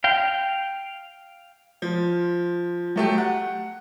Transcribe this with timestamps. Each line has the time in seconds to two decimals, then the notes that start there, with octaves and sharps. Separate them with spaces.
0.04 F5 G5
1.82 F3
2.96 F#3 A3 G4
3.18 F#5